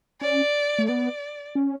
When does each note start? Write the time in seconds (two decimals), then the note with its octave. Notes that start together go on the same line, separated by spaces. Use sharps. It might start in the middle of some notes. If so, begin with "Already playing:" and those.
0.21 C#4 D5
0.79 A3
0.88 B3 D5
1.55 C#4